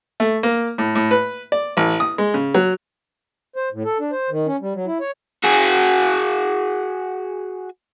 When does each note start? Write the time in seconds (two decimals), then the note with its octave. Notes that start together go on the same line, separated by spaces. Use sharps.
0.20 A3
0.43 A#3
0.78 A2
0.95 A2
1.11 B4
1.52 D5
1.77 A1
2.00 D#6
2.18 G#3
2.34 C#3
2.55 F#3
3.56 C5
3.73 A2
3.85 A4
4.00 D4
4.12 C5
4.30 D#3
4.47 C#4
4.61 G3
4.74 F#3
4.86 E4
5.00 C#5
5.44 F#4 G#4